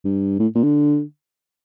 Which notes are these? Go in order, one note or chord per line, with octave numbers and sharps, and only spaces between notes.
G2
A2
A#2
D3